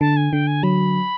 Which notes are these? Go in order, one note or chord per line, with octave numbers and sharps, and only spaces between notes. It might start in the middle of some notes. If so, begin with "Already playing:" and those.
D3 A5
G#5
D3 G5
G#5
F#3 B5